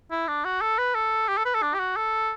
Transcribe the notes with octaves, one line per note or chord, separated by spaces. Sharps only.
E4
D4
F#4
A4
B4
A4
G4
A4
B4
A4
D4
G4
F#4
A4